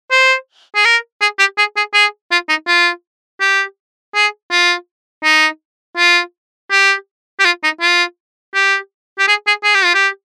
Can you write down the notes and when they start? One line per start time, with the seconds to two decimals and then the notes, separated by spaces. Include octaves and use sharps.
0.11 C5
0.75 G#4
0.85 A#4
1.21 G#4
1.39 G4
1.58 G#4
1.76 G#4
1.94 G#4
2.31 F4
2.49 D#4
2.67 F4
3.40 G4
4.15 G#4
4.51 F4
5.24 D#4
5.97 F4
6.71 G4
7.39 G4
7.45 F4
7.63 D#4
7.81 F4
8.54 G4
9.19 G4
9.28 G#4
9.47 G#4
9.64 G#4
9.74 G4
9.84 F4
9.94 G4